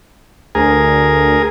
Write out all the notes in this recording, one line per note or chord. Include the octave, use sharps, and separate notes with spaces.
D2 G#4 A#4